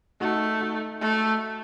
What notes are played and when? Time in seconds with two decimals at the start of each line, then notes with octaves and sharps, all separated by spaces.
0.20 A3 D#4 F#4
0.60 D#4 F#4
1.01 A3